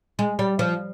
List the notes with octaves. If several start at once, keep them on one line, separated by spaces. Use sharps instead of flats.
G#3
G3
F3